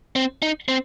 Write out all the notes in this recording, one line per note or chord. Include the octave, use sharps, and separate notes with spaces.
C4
D#4
C4